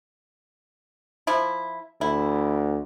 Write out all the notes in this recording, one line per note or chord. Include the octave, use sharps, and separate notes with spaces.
F3 E4
D2 E4